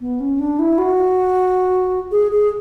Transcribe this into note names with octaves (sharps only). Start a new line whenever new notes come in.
B3
C#4
D4
E4
F#4
G#4
G#4